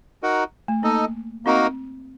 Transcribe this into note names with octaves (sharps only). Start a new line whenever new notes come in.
D#4 F#4 A#4 F#5
A3
A#3 D#4 A4 D#5
A#3 C4 D#4 F#4 A#4